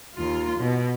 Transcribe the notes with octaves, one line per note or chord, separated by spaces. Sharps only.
D#2 F4
B2